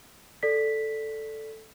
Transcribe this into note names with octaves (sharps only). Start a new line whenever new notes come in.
A4 D5 B6